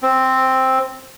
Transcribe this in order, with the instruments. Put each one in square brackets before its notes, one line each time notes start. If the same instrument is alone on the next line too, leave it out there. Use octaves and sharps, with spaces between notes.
[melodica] C4